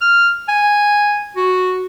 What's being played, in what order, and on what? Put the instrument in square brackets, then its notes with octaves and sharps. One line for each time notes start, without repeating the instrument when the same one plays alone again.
[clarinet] F6
G#5
F#4